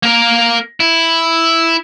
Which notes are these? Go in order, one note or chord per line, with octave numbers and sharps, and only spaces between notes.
A#3 A#4
E4